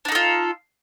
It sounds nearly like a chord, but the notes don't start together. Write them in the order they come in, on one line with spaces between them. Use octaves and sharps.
D4 D#4 A4 F4